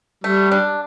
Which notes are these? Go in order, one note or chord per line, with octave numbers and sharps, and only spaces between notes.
G3 A3
D4